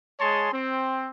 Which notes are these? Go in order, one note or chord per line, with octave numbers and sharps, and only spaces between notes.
G#3 G#4 C#5 A5 C6
C4